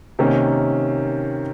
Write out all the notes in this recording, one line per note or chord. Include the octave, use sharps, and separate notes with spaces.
C3 D#3 A#3 C#4